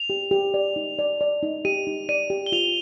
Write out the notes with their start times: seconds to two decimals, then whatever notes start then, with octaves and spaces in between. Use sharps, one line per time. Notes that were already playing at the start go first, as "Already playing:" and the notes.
Already playing: F7
0.10 G4
0.31 G4
0.54 D5
0.76 D#4
0.99 D5
1.21 D5
1.43 D#4
1.65 G4 D#7
1.87 D#4
2.09 D5 D#7
2.30 G4
2.46 G7
2.52 F4 F7